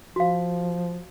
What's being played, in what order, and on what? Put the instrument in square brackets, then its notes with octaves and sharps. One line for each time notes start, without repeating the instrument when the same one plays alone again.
[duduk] F3 [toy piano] F#4 F5